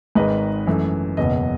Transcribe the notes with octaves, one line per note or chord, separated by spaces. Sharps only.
G#1 G#2 D#3 G#3 B4 D#5
F#2 E3 A3
F#1 E2 B2 B4 D#5